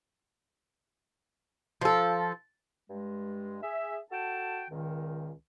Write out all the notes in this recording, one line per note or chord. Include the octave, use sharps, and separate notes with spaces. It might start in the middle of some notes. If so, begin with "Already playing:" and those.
F3 A4
G2 G#3
G#4 E5
F#4 A4 F#5 G5 A5
C#2 A#2 D#3